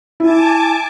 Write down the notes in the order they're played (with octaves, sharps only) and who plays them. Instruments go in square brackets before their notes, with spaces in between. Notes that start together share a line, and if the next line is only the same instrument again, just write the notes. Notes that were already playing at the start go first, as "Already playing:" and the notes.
[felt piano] E4 [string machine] G#5 A5 D6